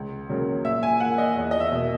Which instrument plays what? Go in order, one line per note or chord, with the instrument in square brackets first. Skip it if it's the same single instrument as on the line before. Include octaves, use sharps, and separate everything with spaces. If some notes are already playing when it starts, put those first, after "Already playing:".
Already playing: [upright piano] C#2
C#3 F#3 A#3
A#2 E5
G#5
A#3 F#5
D#5
E2
D#5
E5
B2 A#3